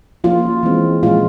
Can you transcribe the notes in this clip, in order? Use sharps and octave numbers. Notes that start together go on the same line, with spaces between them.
F3 A#3 C#4 F4
E3 G#3 C4
A#2 F3 G#3 C#4 F4